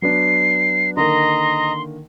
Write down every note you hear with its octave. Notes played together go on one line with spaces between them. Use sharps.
F#3 B3 D4 C7
D3 D#3 A#3 D#5 A#5 C6